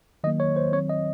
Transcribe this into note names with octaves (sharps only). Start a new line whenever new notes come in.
D#3 F#3 A#3 D#5
C#5
C5
D#3 F#3 C4 C#5
D#5